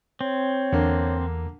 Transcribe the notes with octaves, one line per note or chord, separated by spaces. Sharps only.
C4 C#5
E2 D3 A#3